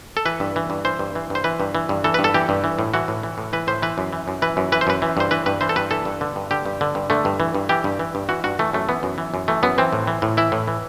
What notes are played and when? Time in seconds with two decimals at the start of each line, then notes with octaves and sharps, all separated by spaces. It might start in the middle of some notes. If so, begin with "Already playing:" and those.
0.17 A4
0.25 E3 B4
0.40 G2
0.56 E3
0.70 G2
0.85 E3 C5
0.99 G2
1.15 E3
1.30 G2 C5
1.44 E3 B4
1.60 G2
1.75 E3
1.89 G2
2.04 E3 A4
2.14 G2 B4
2.24 A4
2.34 E3 G4
2.49 G2
2.64 E3
2.79 A2
2.94 E3 F#4
3.08 A2
3.23 E3
3.38 A2
3.53 E3 B4
3.67 A2 C5
3.82 E3 B4
3.98 F#2
4.13 E3
4.28 F#2
4.42 E3 B4
4.57 F#2
4.72 E3 B4
4.81 C5
4.87 F#2 B4
5.02 E3
5.17 G2 C5
5.31 E3 B4
5.46 G2 B4
5.61 E3 C5
5.69 A4
5.76 G2 B4
5.91 E3 A4
6.05 G2
6.21 D3
6.36 G2
6.51 D3 G4
6.66 G2
6.81 D3
6.95 G2
7.10 D3 A3
7.25 G2
7.40 E3
7.55 G2
7.69 E3 G4
7.84 G2
7.99 E3
8.15 G2
8.29 E3 F#4
8.44 G2 F#4
8.59 E3 A3
8.73 F#2 A3
8.89 E3 B3
9.03 F#2
9.18 E3
9.34 F#2
9.48 E3 A3
9.63 F#2 B3
9.78 E3 C4
9.93 A2
10.07 E3
10.22 A2
10.37 E3 E4
10.52 A2
10.68 E3